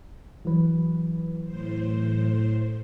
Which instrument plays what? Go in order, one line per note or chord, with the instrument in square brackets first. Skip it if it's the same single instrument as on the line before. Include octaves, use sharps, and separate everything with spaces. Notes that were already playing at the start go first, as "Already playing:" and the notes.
[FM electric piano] E3 F#3 B4
[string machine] A2 C5